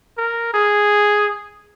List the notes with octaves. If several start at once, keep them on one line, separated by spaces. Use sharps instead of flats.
A#4
G#4